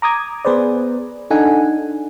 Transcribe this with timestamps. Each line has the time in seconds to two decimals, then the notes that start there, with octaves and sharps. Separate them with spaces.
0.02 A#5 D6 D#6 G#6
0.45 B3 G#4 B4 C5 D5
1.30 D4 D#4 A4 F#5 G#5